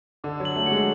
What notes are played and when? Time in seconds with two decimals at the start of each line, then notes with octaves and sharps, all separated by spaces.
0.24 D3 D6
0.40 F#3
0.45 F#7
0.56 A3
0.66 F#3 C#7
0.72 G#3